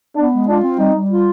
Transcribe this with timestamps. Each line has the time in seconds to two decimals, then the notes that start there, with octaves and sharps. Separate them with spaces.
0.16 B3 D4
0.33 G#3
0.48 D4 F4
0.64 C4
0.79 G3 D#4
0.94 G3
1.10 F4